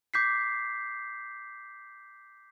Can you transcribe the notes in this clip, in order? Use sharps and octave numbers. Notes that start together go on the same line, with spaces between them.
D6 G6 B6 C7